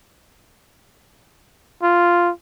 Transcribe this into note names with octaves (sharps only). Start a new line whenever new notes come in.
F4